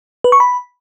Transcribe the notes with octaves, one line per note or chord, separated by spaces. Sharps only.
B4
C#6
B5